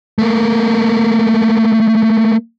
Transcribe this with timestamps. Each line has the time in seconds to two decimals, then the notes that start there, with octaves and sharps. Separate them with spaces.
0.19 A3 A#3